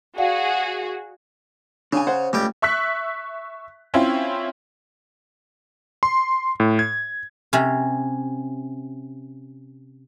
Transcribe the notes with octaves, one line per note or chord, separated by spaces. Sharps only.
F#4 G#4 D5 F5 F#5
C#3 D4 G#5
C5 C#5 F#5
C#2 G3 A3 G5
E5 C#6 E6 F#6 B6
C4 C#4 E4 F4
C6
A2
G#6
C3 C#4